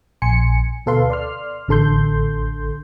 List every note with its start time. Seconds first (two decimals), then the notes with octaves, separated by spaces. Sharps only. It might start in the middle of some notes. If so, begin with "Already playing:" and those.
0.22 A#1 G#5 C6 C#7
0.86 D2 B2 A4 B4 F5 C6
1.10 D5 C6 F6
1.68 A1 D3 A4 C6 G6